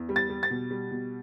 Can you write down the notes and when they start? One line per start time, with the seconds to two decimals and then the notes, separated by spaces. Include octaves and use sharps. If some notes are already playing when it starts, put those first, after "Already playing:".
Already playing: E2
0.09 G3
0.16 A6
0.30 G3
0.43 A6
0.50 B2
0.71 G3
0.91 B2